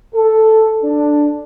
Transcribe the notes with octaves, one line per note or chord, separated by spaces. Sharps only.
A4
D4